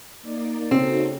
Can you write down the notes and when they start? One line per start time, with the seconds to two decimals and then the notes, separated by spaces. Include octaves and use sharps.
0.22 A#3 D#4 D5
0.71 C#3 C4 D#4 F#4 A4